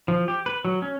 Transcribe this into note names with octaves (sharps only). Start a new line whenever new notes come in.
F3
G4
B4
F#3
C#4